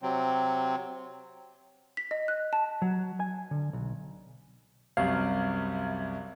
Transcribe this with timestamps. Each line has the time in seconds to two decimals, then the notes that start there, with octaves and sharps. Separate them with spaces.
0.03 C3 F#3 C4
1.97 B6
2.11 D#5
2.28 F#6
2.53 A5
2.82 F#3
3.20 G#5
3.51 D3
3.73 B1
4.97 C2 F#2 C3 F5